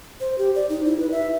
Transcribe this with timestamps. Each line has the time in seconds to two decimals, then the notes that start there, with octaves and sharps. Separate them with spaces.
0.21 C5
0.38 G4
0.55 D5
0.69 D#4
0.85 E4
1.00 B4
1.12 E5